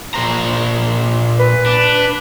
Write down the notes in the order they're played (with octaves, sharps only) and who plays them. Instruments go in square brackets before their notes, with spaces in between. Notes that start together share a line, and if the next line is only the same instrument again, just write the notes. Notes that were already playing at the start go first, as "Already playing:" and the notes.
[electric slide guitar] A#2 C5 A#5
[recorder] B4
[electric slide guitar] D4